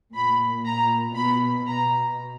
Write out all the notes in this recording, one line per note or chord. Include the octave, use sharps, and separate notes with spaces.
A#2 B5
A#2 A#5
B2 B5
B2 A#5